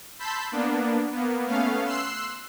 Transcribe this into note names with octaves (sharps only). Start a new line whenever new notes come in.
A5 B5 C6 E6 G6 B6
A#3 B3 D4
A#3 B3
A3 B3 C#4 F5
C6 E6 F#6 C7